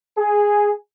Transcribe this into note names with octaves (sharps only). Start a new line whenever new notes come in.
G#4